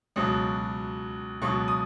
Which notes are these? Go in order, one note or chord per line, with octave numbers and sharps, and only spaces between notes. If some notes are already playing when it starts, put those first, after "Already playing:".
C#2 B2 F#3
C#2 B2 F#3 C#6
D#6